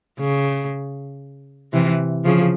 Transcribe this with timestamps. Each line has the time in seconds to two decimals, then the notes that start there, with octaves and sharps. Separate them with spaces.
0.20 C#3
1.73 C3 E3
2.24 C#3 F3